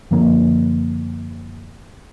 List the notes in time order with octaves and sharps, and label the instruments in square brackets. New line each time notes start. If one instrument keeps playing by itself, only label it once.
[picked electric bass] F#2 D3 F3 A#3